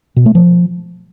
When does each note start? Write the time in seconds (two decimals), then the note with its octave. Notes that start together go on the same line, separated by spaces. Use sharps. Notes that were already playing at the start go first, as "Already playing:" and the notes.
0.16 B2
0.26 A3
0.35 F3